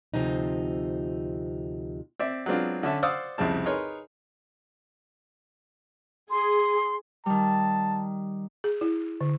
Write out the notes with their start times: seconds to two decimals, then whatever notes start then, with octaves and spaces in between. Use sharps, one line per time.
0.14 D2 C3 F3 D#4
2.19 C4 D5 E5
2.46 F#3 G#3 B3 C4 D4 F4
2.83 D3 C#4 E5 A5
3.03 C5 D5 F5 F#5 D#6 E6
3.38 C2 F2 C#3 C4 A5
3.66 D#4 G#4 A#4 B4 C#5 C6
6.30 G#4 C6
7.26 D#3 G3 A5
8.64 G#4
8.81 E4
9.21 D3